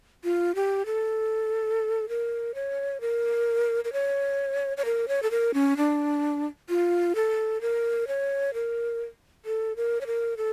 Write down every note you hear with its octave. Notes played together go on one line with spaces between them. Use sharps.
F4
G4
A4
A#4
C#5
A#4
A#4
C#5
C#5
A#4
C#5
A4
A#4
C#4
D4
F4
A4
A#4
C#5
A#4
A4
A#4
C#5
A#4
A4